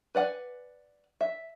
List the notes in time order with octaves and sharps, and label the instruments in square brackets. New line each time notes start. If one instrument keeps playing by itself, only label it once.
[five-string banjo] B4 D5 F#5 G#5
E5